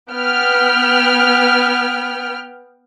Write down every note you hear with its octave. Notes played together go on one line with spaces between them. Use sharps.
B3 G5 F6